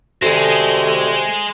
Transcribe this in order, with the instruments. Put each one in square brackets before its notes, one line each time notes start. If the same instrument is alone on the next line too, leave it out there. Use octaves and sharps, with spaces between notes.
[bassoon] C3 [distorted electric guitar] G#3 [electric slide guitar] F#4 D5 [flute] A4